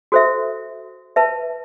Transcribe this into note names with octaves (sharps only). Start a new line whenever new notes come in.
F#4 A4 C5 E5
B4 E5 A5